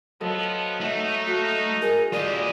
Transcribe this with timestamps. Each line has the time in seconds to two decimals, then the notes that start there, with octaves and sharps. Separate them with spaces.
0.21 F3 F#3 B3 A4 D#5
0.81 A3 D#4 F#5
1.27 F#4 F5
1.82 G#4 A#4
2.13 D3 G#3 F4 G4 D5 D#5